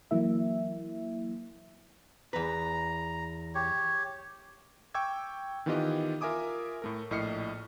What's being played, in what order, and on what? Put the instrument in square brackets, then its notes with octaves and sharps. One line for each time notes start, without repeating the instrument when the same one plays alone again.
[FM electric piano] E3 F#3 A#3 E4 E5
[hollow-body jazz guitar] E2 B4 [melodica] A#5
[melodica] G4 C#5
[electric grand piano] G5 C#6 D6 E6 G#6
D#3 E3 B3 F4 G4 D#5
F4 A#4 E5 G#5 D6 D#6
A2 A3 A#4
A#1 A2 D#5 F6 C7 C#7